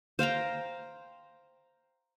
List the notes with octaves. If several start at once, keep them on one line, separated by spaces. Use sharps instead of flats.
C5 F5 G5 A#5